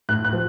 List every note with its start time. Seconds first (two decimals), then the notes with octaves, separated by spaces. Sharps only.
0.09 A2 F#6
0.25 F#6
0.33 F3